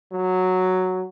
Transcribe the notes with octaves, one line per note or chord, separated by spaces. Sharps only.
F#3